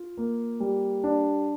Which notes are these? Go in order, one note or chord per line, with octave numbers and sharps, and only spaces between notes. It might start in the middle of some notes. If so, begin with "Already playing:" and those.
Already playing: F4
A#3
G3
D4